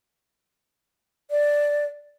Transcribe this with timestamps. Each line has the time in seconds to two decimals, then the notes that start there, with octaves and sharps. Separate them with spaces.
1.31 D5